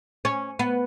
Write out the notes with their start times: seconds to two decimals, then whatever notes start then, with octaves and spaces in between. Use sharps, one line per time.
0.25 C#4
0.59 B3